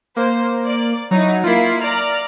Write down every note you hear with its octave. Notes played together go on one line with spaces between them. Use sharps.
A#3 C5
D5
F#3 D#4 E4
A#3 E4 F4 C7
D5 A#5 F6